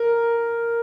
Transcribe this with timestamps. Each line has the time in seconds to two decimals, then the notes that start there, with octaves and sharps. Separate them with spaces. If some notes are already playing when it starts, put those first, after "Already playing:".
Already playing: A#4